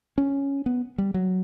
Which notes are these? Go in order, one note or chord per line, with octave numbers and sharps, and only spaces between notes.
C#4
B3
G3
F#3